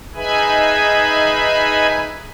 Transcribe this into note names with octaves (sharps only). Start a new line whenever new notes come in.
D#4 G#4 B4 E5 G#5 B5